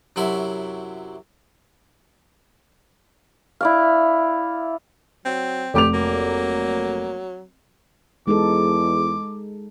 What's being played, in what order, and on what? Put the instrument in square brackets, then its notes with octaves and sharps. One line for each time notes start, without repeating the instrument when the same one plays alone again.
[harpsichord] F#2 C3 F#3 E4 B5 C6
[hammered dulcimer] E4 D5 F5
[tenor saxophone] F#3 [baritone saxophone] C4
[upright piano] F1 D6 F7 [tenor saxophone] G4
[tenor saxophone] F#3 [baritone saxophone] A#3
[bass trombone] E2 [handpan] G#3 D#4 A4 [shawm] D6